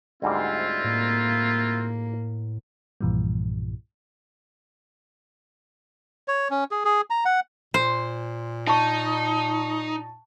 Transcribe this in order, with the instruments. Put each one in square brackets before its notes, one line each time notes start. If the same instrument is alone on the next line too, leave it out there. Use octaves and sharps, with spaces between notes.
[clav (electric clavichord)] D2 G#2 G3 [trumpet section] C4 E4 F4
[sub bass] A2 [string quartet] A#3
[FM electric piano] B1 G2 A#2 E3 F3 G3
[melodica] C#5
C#4
G#4
G#4
A#5
F#5
[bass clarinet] A#2 [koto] C5
[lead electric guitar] D#4 [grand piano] A5 C#6